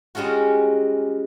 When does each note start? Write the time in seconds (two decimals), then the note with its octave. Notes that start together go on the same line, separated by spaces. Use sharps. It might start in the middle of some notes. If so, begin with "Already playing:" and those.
0.15 G3 G#3 C#4 F4 F#4